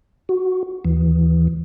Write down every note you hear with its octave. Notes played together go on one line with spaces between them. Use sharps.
F#4
D#2 E3